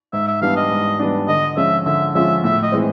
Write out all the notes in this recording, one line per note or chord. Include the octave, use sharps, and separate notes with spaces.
G#2 E5
E5
E3 G3 B3 D4 F5
D#5
G#2
E3 G3 B3 D4
D3 D#5
F3 G#3 C#4 F4 E5
D3 E5
F3 G#3 C#4 F4 E5
A2 E5
D#5
E3 G#3 C4